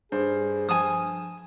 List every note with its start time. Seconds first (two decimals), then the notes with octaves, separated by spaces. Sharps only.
0.12 G2 G#4 C5
0.69 F3 G#5 A5 D#6